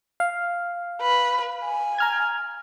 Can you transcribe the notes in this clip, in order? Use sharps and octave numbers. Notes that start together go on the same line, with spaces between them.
F5
B4
G#5
A#5 F6 G#6